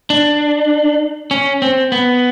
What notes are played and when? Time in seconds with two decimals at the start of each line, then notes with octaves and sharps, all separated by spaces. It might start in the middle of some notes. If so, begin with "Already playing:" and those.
0.10 D4
1.31 C#4
1.62 C4
1.92 B3